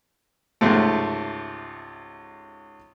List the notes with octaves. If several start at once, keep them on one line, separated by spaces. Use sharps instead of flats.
C#2 G#2 C3 A3